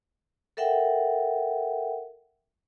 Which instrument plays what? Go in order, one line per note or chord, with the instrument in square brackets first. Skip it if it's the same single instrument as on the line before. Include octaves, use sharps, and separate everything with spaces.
[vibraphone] A4 A#4 E5 F#5 G5